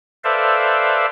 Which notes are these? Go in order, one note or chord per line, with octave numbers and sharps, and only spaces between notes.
A4 B4 C5 D5 E5 F5